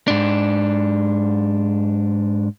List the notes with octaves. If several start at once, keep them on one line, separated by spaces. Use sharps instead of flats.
G#2 D4